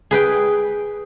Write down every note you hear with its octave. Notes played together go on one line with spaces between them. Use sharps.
G#4 B4 G5